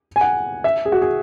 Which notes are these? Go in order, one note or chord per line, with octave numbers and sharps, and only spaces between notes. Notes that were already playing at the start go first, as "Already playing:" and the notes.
G#5
F#5
E5
G#4
F#4
G#4